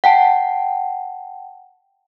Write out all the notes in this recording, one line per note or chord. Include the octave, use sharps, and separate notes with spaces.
F#5 G5 A5